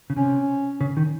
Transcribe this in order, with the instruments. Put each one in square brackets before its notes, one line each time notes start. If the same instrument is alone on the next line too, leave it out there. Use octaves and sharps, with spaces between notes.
[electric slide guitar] C#3
[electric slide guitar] C3 [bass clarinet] C#4
[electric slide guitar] C#3
D#3